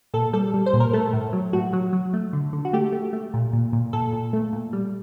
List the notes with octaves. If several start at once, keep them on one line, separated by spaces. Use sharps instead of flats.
A#2 A4
G3 A4
G3
C5
A#2
A#4
A3 A4
A2
F#3
A2 F#4
F#3
F#3
A3
D3
D3
F#4
A3 G4
A3
A3
A#2
A#2
A#2
A#2 A4
A#2
A3
A#2
G3